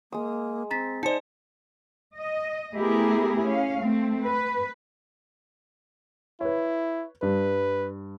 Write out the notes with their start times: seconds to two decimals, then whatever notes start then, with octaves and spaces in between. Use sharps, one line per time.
0.12 G#3 A#3 D#6
0.71 C4 A#5 A6 B6
1.03 G#3 D#4 C5 D5 A5 C#7
2.17 D#5
2.77 A3 B3 E4 G4 G#4 A#4
3.44 C#4 F5
3.81 A3 C4
4.24 B4
6.41 E4 B4 C#5
7.22 G2 B4